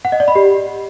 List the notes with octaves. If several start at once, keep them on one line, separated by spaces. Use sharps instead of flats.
F#5
D#5
D5
B5
G4